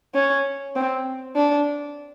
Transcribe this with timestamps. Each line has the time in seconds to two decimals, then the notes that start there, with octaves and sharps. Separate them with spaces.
0.15 C#4
0.76 C4
1.36 D4